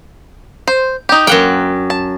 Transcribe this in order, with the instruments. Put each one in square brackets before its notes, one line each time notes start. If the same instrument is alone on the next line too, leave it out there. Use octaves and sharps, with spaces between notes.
[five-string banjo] C5
D#4 G4
[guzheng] F#2 F#5 G5 [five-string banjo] A#3
[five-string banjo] A5